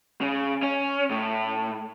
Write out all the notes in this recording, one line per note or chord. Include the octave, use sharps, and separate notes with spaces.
C#3
C#4
A2